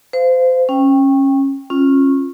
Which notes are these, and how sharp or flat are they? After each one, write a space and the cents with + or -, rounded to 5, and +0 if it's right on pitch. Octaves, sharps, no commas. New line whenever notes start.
C5 -30 F5 -10
C#4 -20 G5 +10
C#4 -25 F4 +0